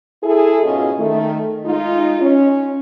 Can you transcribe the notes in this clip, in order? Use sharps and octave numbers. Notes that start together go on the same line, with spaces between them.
E4 G#4 A4
G#2 B2 C#4 F4 G#4 D#5
D#3 A3
G#3 D#4 F4
C#4